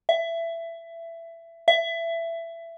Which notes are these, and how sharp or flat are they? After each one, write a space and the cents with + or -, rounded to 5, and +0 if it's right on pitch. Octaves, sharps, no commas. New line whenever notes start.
E5 +20
E5 +20